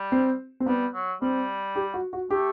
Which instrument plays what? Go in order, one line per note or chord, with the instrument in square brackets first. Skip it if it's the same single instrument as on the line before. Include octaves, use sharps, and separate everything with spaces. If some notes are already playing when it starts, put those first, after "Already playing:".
Already playing: [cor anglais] G3
[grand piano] C4
C4
[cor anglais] G3 [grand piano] B3
[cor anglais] F#3
[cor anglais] G3 [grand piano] C4
[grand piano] G4
F#4
F#4
[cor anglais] A3 [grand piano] G4